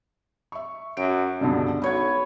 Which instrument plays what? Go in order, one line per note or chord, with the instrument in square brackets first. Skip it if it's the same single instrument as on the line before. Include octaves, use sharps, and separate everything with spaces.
[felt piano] E5 C#6
[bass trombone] F#2 [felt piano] D7
[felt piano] C#2 G2 B2 [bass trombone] D3
[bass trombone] B1 [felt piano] F#4 G#6 [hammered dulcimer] B4 C#5